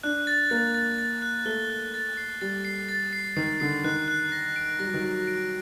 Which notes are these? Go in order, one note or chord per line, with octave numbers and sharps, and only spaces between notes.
D4 F#6
A6
A#3 A6
A6
A6
F#6
A3 G7
F#6
A6
C7
G3 A6
C7
A6
C7
D#3 C7
D3 C7
D#3 F#6
F#6
A#6
D7
G3 A#6
F#3
D#3
F#3 D7
D7